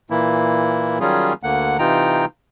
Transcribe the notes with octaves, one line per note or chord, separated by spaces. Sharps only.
A#2 E3 A#3 E4
D#3 F#3 G3 C#4 F4 G#4
D2 D3 A#3 F#5
C3 E3 D#4 F4 G5 A#5